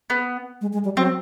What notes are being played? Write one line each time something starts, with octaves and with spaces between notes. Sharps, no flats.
B3
G#3
G#3
G3
F#3 C4